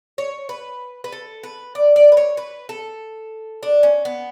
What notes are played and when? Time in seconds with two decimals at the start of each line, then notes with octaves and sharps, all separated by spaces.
0.18 C#5
0.49 B4
1.04 B4
1.12 A4
1.43 B4
1.75 D5
1.96 D5
2.12 B4
2.17 C#5
2.37 B4
2.69 A4
3.63 D4
3.83 C#4
4.05 B3